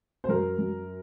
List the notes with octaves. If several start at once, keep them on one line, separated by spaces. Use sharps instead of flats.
C5
F#2 A#4
F#2